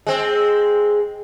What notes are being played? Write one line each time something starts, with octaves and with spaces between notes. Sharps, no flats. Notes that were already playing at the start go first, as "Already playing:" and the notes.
G#3 C4